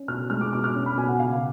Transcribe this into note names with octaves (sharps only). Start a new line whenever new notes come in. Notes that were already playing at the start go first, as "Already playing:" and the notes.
Already playing: C#4
B2 F6
G#3 F6
D6
B2 D6
F6
C#4
B5
B2 G#5
F#5
C#3 F5